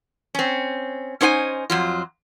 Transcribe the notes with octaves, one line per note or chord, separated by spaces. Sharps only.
C4 C#4
C#4 D#4 C5 F#5 G#5
F2 F#3 F4